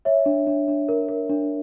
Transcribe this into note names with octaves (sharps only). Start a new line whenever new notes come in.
C#5 E5
D4
D4
D4
A#4
A#4
D4